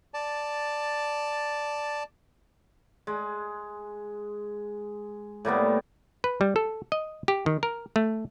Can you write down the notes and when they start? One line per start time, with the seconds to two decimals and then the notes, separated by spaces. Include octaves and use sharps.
0.14 D5 A5
3.07 G#3
5.45 A2 G3 A#3 B3
6.24 B4
6.41 G3
6.56 A4
6.92 D#5
7.28 G4
7.46 D#3
7.63 A#4
7.96 A3